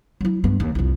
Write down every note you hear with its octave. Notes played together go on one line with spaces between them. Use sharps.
F#3 E4
G2 B3
D#2
C2 F2